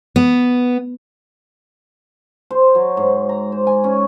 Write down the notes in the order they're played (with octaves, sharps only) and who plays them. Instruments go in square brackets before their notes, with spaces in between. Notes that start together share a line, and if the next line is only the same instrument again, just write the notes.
[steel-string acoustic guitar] B3
[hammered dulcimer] C5
F#3
G#2
A#5
C5
G#5
C#4